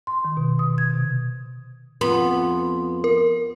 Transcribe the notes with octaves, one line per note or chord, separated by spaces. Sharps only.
C6
D#3
B2
D#6
G#6
C3
F2 B3 C6
A#4